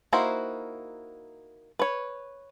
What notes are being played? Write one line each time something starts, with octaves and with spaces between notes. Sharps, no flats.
A#3 D#4 E4 F#4 C5
B4 C#5